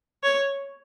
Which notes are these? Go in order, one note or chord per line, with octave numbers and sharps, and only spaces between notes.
C#5